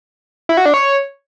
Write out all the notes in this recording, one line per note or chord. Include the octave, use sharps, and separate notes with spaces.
E4
F#4
D4
C#5